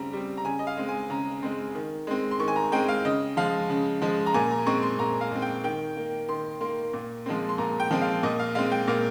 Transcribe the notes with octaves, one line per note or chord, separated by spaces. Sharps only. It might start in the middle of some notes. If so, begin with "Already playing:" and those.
Already playing: C#3 G3 C4 A#5
G3 C4
A#5
C#3 G#5
D#5
F5
G#3 C4
G#5
C#3 A#5
G#3 C4
D#3
G#3 C4
C6
D#3 C#6
G#5
A#5
G#3 C4 G5
F5
C#3 D#5
F3 G#3 F5
C#3
F3 G#3
A#5
A#2 G#5
A#5
G#3 C4 C#6
C6
A#2 A#5
F5
G#3 C4
G5
D#3 G5
A#3
D#3 C6
A#3 C6
A#2
F3 G#3 C4
C6
A#2 A#5
G5
F3 G#3 C4
F5
A#2 D#5
F5
G#3 C4 F5
G5
A#2 F5